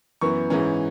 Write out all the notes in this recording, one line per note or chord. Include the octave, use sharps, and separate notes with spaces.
F#2 E3 B3 C#6
G#2 E3 C#4